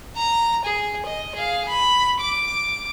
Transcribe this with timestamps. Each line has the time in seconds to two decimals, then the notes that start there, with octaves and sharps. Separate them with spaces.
0.16 A#5
0.65 G#4
1.05 D#5
1.35 G#4 F5
1.68 B5
2.20 D6